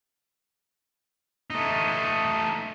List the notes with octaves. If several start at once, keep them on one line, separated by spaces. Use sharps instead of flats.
A3 D#4